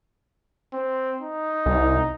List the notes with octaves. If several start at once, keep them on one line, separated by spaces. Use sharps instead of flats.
C4
D#4
C2